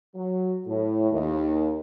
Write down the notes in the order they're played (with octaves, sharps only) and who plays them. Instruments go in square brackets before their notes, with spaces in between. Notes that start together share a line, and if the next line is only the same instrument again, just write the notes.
[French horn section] F#3
A2
D#2